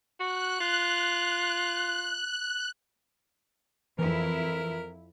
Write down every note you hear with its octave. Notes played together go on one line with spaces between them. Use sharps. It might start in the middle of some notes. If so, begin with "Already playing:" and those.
F#4 F#6
F4
F2 E3 E4 A#4